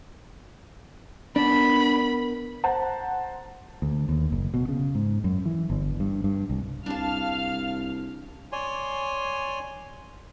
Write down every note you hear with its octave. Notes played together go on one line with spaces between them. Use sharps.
B3 D4 A#4 B5
C5 F#5 A5 A#5
D2
D#2
F#1
B2
C#3
G#2
F#2
E3
G1
G2
G2
C2
C2 D4 F5 A5 F6
C#5 D5 G#5 C6